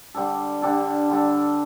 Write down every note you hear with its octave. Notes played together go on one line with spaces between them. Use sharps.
D3 G3 D4 A4
D3 G3 D4 A4
D3 G3 D4 A4